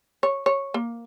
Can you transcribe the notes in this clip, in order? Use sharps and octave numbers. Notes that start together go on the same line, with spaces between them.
C#5
C#5
A#3